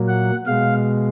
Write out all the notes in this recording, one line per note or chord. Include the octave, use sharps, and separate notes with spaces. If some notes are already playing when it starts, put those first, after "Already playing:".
Already playing: A#2 F#3 A#3
F#5
B2 G#3 F5